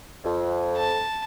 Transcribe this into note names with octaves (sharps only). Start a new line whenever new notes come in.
F2
A5